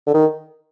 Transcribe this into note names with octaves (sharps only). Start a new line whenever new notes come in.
D3
D#3